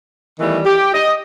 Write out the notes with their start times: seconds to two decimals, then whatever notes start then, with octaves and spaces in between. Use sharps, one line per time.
0.40 D#3 E3 G3 A3 B3
0.66 G4
0.94 D#5